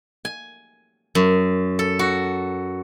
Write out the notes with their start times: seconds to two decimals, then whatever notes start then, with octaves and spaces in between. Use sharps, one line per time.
0.25 G#5
1.15 F#2
1.79 A4
1.99 F#4